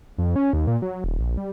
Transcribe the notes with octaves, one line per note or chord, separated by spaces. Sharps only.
F2
C#4
D#2
A#2
F#3
D#1
A#1
G3